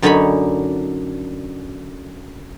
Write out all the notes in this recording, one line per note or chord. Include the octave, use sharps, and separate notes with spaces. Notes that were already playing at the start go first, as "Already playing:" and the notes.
F#2 D3 D#4 C#5 G#5 B5